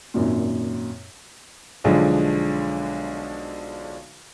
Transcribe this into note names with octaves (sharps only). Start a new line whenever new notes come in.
G#1 F#2 A#2
B1 D3 F3 G#3